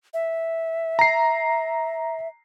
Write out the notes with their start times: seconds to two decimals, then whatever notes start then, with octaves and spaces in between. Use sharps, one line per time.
0.14 E5
0.99 A#5 C7